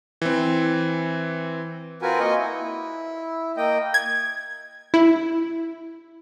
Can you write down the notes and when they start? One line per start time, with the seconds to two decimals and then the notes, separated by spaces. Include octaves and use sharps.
0.22 E3 C4
2.02 C4 F4 F#4 A#4 B4 G#5
2.20 A#3 D#5 G#5 C#6
2.37 E4
3.57 A#3 D#5 G5
3.94 G#6
4.94 E4